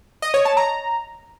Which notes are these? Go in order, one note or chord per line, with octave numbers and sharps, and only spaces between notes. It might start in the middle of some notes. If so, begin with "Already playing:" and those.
D#5
C#5
A5
A#5